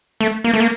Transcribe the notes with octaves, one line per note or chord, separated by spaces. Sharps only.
A3
A#3
A3
A#3